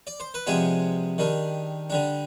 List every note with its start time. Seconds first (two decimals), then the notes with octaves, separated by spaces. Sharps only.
0.07 D5
0.20 C5
0.34 B4
0.47 C3 F3 G#3 B3 D4 G#4
1.18 D#3 G3 D4
1.90 D3 G3 D4